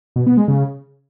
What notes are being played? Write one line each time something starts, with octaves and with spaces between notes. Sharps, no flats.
B2
B3
G#3
C#3